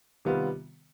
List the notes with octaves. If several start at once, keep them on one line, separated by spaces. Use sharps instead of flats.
C3 D#3 G3 B3 F4